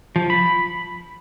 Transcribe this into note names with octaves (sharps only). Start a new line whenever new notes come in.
F3
B5